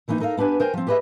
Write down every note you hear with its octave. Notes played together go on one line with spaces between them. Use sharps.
D#3 E3 A#3 D4 D#4
D#4 A4 A#4 D#5 F5
B3 D4 G4 B4 G#5
A#4 C5 G5 G#5
F3 C4
G4 G#4 B4 C5 D#5 E5